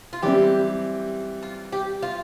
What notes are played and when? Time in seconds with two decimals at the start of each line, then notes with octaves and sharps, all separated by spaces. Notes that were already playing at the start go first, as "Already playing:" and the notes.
0.13 F4
0.23 E3 G3 C4 G4
1.43 F4
1.72 G4
2.02 F4